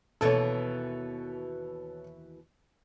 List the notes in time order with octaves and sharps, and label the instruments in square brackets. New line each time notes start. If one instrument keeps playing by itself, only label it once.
[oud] D#2 B2 E3 [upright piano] A4 C#5